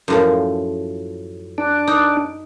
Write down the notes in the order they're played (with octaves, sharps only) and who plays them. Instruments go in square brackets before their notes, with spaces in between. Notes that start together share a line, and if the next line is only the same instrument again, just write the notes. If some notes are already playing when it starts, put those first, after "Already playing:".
[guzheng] F#2 A2 F3
[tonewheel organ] D4
[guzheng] D#4